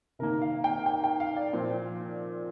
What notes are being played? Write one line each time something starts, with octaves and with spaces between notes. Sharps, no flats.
C3 D#3 A#3 A#4
F5
G5
G5
G5
F5
D5
A#2 F3 C4